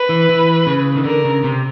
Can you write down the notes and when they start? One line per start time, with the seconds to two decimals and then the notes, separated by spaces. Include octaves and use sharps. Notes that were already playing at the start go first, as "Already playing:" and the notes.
Already playing: B4
0.09 E3
0.29 E3
0.67 C#3
0.96 D#3
1.04 D3 A#4
1.24 C#3
1.44 C3